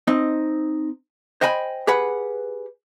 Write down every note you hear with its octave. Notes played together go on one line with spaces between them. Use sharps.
C4 D#4 D#5
C5 D#5 G5 G#5 B5
G4 G#4 B4 F#5